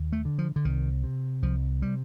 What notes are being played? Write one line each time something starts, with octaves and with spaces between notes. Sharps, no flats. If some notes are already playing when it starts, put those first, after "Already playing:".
Already playing: D#2
A3
D3
F3
D3
C2 D#3
C3
C2 F3
C3 G3